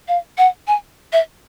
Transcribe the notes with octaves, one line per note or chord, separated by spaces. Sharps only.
F5
F#5
G#5
E5